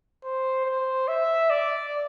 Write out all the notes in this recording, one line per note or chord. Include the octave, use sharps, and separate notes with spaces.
C5
C5
E5
D5